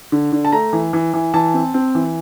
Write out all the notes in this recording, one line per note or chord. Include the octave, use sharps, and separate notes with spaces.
D3
D3
A5
A3 A#5
E3
E3
E3
E3 A5
C4
C4
E3